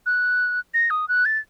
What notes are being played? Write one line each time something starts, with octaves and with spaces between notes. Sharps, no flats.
F#6
A#6
D#6
F#6
A6